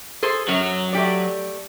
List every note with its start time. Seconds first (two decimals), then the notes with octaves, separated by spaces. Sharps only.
0.23 G#4 A4 C5
0.48 F#2 F#3
0.93 A3 G4 D5